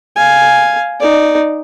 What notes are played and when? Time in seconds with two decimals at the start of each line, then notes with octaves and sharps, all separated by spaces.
0.16 F5 G#5
1.00 D#4 D5